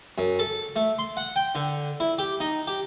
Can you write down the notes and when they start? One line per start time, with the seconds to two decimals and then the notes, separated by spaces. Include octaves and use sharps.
0.18 F#2
0.39 A4
0.76 A3
0.99 C6
1.17 F#5
1.36 G5
1.55 D3
2.00 E4
2.18 G4
2.40 D#4
2.67 G4